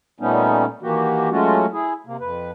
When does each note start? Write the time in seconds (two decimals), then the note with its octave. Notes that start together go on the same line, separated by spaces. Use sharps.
0.20 A#2 G3 A3 B3 C#4 D#4
0.82 D#3 E3 A#3 F#4 G4
1.31 F#3 G#3 A3 C#4 F4 F#4
1.73 E4 G#4
2.07 C3 A#3
2.20 F2 B4